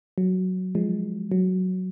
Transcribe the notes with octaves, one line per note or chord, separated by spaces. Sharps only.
F#3
F3 G#3
F#3